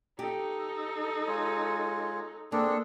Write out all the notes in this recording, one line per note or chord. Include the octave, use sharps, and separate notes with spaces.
D#4 G4 A4
G#3 F4 C#5
A#3 C4 D4 G#4 A4